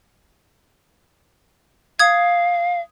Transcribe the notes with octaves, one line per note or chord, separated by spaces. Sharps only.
F5 D#6 G#6